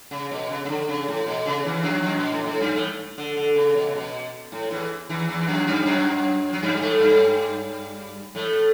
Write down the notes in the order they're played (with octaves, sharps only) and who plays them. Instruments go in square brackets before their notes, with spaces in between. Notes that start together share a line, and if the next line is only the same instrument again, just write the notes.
[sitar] C#3
B2
C#3
C#3
D3
C#3
A2
B2
C#3
E2 E3
F#2 F#3
F#2 F#3
B2
A2
B2
A2
G2 G3
A2 A3
D3
D3
C#3
B2
C#3
B2
A2
E2 E3
E2 E3
E2 E3
E3
F#2 F#3
G2 G3
F#2 F#3
F#3
G2 G3
A2 A3
G2 G3
A2 A3